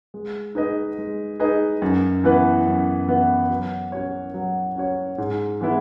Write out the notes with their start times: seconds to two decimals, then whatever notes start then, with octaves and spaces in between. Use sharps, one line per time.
0.14 G#3
0.55 D#4 G#4 B4 D#5
0.98 G#3
1.40 D#4 G#4 B4 D#5
1.82 F#2
2.24 E3 B3 E4 B4
2.66 F#2
3.08 E3 B3 E4 B4
3.50 F#3
3.92 C#4 F#4 C#5
4.34 F#3
4.76 C#4 F#4 C#5
5.18 G#2
5.61 E3 G#3 B3 E4